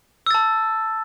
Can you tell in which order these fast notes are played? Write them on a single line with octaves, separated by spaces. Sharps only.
E6 A6 A5